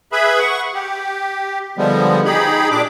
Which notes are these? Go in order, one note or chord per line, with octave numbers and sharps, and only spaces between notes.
G#4 B4 E5 B5
F#5 C#6
G4
D3 F3 G3 G#3 B3
D#4 G4 G#4 B5
A#2 D4 D6